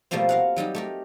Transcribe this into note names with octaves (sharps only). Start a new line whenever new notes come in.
B2 F3 G3 A3 A#3 C4
A#4 F5 F#5
F#3 G3 D#4 G4
A3 G4 A#4